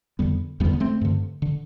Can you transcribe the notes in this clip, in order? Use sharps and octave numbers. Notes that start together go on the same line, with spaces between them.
F2 D3 G3 B3
E2 D3 G3 B3
B3
A3 C4
G2 D3
D3